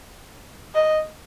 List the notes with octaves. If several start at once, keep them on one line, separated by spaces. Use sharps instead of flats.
D#5